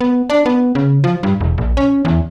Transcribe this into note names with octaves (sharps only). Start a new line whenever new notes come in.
B3
D4
B3
C#3
F3
G2
E1
A#1
C#4
E2